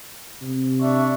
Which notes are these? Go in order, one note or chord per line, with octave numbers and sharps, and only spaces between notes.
C3
D4 E5 C#6